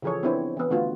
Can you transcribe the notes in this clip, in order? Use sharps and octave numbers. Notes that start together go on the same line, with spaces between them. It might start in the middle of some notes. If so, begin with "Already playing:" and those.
C#3 E3 F3 G#4 A4 C#5
B3 C4 D4 E4 C5 C#5
E3 B3
D3 A3 B3 F4 F#4